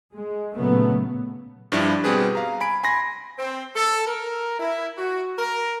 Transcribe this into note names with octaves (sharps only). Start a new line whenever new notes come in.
G#3
A#2 C#3 F#3 A3 B3
G2 F3 G3 D4 E4
B2 G3 C4 G#4 B4
F5 A#5
G#5 B5 D7
G#5 B5 C6 A#6
C4
A4
A#4
E4
F#4
A#4